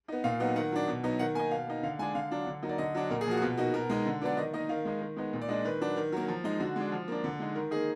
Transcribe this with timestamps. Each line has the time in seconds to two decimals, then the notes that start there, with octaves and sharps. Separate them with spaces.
0.08 B3 D#4
0.24 A#2 F5
0.40 F#3 B3 D#4
0.56 D#3 F#5
0.72 F#3 D4
0.88 B2
1.03 F#3 B3 D#4
1.19 D#3 F#5
1.35 A#3 G#5
1.39 D#4
1.51 B2 F5
1.67 A#3 D#4
1.83 D3 F5
1.99 G#3 G#5
2.02 D4
2.15 D3 F5
2.31 F#3 D4
2.47 D3
2.62 F#3 A#3 D#4
2.69 D5
2.78 D3 D#5
2.95 F#3 D4
3.10 A#2 A#4
3.21 G#4
3.26 F3 A#3 F#4
3.37 F#4
3.42 B2 F4
3.57 A#3 D#4 F#4
3.74 B2 A#4
3.90 G#3 D#4
4.06 D3
4.21 F#3 B3 D4 D5
4.37 D#3 D#5
4.53 A#3 D#4 D#5
4.69 D#3 F5
4.85 G#3 D#4
5.01 D#3
5.17 G#3 B3 D#4
5.33 A#2
5.42 D5
5.48 G#3 D4 D#5
5.65 D#3 B4
5.81 F#3 D4
5.96 D#3
6.12 F#3 A#3
6.28 F3
6.44 G#3 D#4
6.59 D3 F#4
6.76 G#3 D4
6.92 F3
7.08 A#3 D4
7.24 D3
7.39 G#3 D#4
7.55 D#3 A#4
7.71 D#4 G#4
7.75 A#3